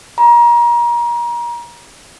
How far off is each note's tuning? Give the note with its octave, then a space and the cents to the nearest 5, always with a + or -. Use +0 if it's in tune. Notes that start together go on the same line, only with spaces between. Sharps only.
A#5 +30